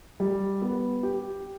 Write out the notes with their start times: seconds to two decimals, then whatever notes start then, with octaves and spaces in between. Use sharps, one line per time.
0.20 G3
0.62 B3
1.03 G4